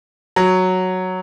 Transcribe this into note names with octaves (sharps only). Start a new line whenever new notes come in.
F#3